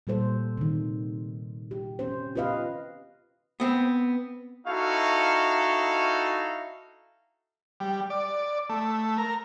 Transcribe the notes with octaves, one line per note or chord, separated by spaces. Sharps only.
A#2 G3 A4 C5
C3 D#3
G4
C4 C#4 C5
F4 G4 B4 D#5 F5
B3 C4
D#4 E4 F#4 A4 F5 C#6
G3
D5
A3
A#4